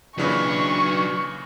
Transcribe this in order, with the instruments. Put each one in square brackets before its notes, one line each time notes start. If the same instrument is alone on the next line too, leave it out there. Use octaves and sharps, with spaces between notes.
[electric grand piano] A#2 C#3 E3 [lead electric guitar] F#3 B4 [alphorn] D4 [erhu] C#6